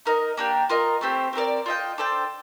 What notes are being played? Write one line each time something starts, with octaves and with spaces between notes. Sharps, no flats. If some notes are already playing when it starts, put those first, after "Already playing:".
D#4 A#4 D#5
A#3 D4 G4
F4 A#4 D#5
A3 C4 G4 C5
C4 G4 A#4 D5
F4 A4 D#5 G5
D4 A4 C5 G5